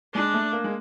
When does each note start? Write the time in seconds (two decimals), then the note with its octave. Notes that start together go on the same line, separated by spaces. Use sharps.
0.14 G#3 D4
0.34 A3
0.53 A#3
0.64 G#3